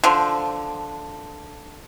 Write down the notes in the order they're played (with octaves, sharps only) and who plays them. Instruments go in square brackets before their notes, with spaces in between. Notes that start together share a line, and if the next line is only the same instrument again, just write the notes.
[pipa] D3 F3